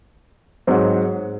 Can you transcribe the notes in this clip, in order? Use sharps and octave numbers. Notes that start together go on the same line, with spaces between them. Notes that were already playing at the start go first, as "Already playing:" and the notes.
G#2 F#3 C4